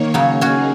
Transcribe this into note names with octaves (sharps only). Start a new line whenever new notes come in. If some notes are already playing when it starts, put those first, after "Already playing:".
Already playing: D#3 A#3 C#5
C#3 F#3
A#3 C#4 D#4 F#4 G#4